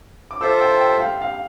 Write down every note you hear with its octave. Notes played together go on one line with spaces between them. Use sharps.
D6
F4 A4 C5 E5 E6
G5
G5
F5
F5